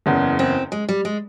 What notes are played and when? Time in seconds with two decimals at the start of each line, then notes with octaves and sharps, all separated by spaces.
0.06 F#1 E2 C#3
0.39 C4
0.72 G#3
0.89 G3
1.05 G#3